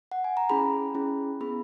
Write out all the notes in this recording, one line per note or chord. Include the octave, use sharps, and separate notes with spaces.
F#5
G#5
A#5
C#4 E4 G#4 B5
C#4 E4 G#4
B3 E4 G#4 B5